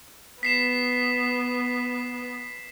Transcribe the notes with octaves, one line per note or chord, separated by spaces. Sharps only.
B3 B6 C7 E7